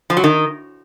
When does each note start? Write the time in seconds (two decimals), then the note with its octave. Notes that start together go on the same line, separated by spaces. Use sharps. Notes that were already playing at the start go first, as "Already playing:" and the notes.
0.10 F3
0.17 F#3
0.24 D#3